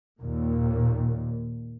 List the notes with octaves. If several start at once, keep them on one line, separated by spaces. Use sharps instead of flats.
D#2 A#2